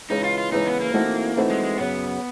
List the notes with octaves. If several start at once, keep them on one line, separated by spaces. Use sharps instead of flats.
C#3 E3 G#3 C#4 D#4
F4
F4
C#3 E3 G#3 C#4 D#4
B3
A#3
E3 A3 C4 D#4 F#4
E3 A3 C4 D#4 F#4
G#3
G#3
F#2 C#3 F#3 B3